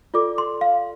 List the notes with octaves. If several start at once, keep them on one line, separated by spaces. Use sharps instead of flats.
F4 A4 D5 D6
C6
F5